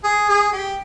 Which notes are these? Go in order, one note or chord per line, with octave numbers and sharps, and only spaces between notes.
G#4
G#4
G4